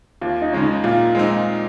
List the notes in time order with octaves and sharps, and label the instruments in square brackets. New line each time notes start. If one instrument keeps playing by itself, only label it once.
[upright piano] D#2 [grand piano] F4
[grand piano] D#4
[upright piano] C#3 G#3 C#4
[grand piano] D#4
[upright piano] A#2 [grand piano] F4
[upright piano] G#3 C4 D#4